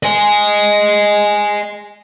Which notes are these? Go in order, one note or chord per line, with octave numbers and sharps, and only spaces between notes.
D#5 G#5